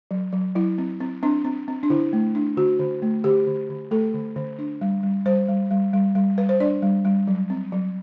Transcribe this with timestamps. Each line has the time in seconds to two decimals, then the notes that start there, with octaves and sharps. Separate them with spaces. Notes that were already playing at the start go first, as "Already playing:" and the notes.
0.11 F#3
0.33 F#3
0.55 F#3 E4
0.78 C4
1.00 C4
1.23 C4 D4
1.45 C4
1.68 C4
1.83 D4
1.90 D3 E4
2.13 A3
2.35 D4
2.57 D3 F#4
2.79 D3
3.02 A3
3.24 D3 G4
3.47 D3
3.69 D3
3.91 A3 A4
4.14 D3
4.36 D3
4.59 D4
4.81 G3
5.03 G3
5.26 G3 C5
5.48 G3
5.71 G3
5.93 G3
6.15 G3
6.38 G3 B4
6.49 C5
6.60 D4 D5
6.82 G3
7.05 G3
7.28 F#3
7.50 C4
7.72 F#3